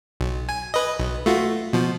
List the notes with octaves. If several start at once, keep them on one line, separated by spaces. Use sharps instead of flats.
B1
G#5
B4 D#5
B1
A3 F4 F#4
B2 F3